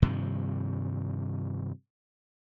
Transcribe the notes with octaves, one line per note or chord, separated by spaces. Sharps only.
G2 C3 D#3 F3